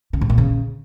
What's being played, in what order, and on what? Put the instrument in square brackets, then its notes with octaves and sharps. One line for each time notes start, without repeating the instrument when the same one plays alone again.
[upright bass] C#3
G#2
A#2
C#3